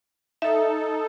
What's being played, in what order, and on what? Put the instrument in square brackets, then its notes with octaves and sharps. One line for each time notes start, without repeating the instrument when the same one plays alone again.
[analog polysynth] D#4 A4 [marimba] E5